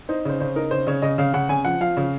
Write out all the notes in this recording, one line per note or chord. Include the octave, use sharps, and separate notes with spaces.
D#4 C5
C#3 C5
C#3 C5
D#4 A#4
C#3 C5
C#3 C#5
C#3 D#5
C#3 F5
C#3 F#5
C#3 G#5
F3 F#5
F3 F5
C#3